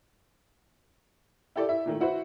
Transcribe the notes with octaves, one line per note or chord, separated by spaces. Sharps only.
E4 G4 A4 D5
E4 E5
A#2 D#3 A3
E4 F#4 B4 C5 E5